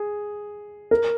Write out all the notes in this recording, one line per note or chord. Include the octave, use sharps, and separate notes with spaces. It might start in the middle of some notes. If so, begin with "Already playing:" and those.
Already playing: G#4
A#4